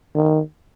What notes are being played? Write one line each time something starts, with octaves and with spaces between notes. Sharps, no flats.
D#3